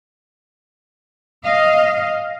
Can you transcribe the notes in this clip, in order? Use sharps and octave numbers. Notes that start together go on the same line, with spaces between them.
D#5 F5